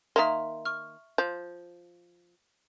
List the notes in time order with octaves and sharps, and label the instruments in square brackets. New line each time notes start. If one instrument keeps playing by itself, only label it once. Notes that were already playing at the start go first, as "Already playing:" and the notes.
[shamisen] D#3 A#3 [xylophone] E5 A#5 C6
[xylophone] C#6 F6
[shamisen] F3 [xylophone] G6